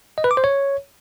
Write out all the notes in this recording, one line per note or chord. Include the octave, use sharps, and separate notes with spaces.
D#5
B4
D6
C5
C#5